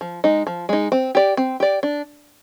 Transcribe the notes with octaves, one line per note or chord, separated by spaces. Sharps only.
F3
G#3 D#4
F3
G#3 D#4
C4
G4 D5
C4
G4 D5
D4